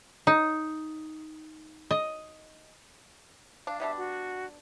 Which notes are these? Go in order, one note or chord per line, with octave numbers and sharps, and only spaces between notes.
D#4
D#5
D4 F5
B2 G3 D4 E5
F#4